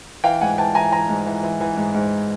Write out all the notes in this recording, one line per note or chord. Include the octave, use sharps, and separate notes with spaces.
E3 F5 G5
G#2 F#5 G#5
E3 G5 A5
E3 G#5 A#5
E3 G#5 A#5
G#2
E3
E3
E3
G#2
G#2